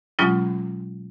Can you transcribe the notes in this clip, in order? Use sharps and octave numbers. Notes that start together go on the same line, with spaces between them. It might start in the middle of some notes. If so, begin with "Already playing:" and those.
B2 F#3 G#3 C#4 F4